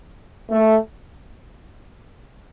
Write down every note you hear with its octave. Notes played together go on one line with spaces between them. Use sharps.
A3